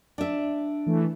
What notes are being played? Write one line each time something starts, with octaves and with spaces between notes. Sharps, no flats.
D4 E5
E3 A3